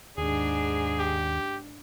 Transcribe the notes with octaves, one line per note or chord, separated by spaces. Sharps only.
D#2 G#2 D4 G#4
G4